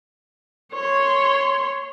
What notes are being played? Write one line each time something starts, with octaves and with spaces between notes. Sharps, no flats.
C#5 C6